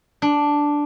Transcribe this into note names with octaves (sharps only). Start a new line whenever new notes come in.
D4